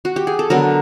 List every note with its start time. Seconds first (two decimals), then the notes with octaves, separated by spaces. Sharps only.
0.05 F#4
0.16 G4
0.27 G#4
0.39 A4
0.50 D3 F#3 B3 A#4